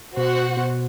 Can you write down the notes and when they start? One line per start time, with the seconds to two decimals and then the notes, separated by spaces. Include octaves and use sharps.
0.17 B2 F#4 C5 F#5
0.57 B2